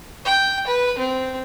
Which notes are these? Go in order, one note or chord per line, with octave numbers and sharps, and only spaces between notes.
G5
B4
C4